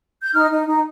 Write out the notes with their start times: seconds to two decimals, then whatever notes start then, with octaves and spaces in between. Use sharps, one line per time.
0.23 G6
0.34 D#4 F6
0.50 D#4
0.67 D#4